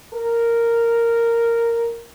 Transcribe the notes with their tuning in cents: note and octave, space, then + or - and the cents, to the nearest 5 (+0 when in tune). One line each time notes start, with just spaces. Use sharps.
A#4 -5